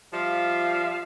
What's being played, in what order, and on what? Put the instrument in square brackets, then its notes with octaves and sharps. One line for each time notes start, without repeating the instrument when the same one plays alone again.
[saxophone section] F3 G3 F4 E5 F5